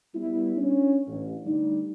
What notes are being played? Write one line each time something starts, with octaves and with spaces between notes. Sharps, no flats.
G3 B3 E4
C#4 D4
A1
D3 G3 A3 D#4